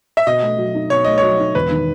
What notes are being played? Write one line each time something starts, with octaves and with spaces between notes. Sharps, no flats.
E5
B2 D#5
A3
F#3
D#4
B2 C#5
A3 D#5
F#3 C#5
D#4
E1 B4
D#3